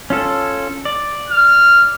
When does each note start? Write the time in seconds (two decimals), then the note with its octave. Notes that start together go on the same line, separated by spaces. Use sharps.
0.10 C#4 F4 A4
0.85 D5
1.29 F6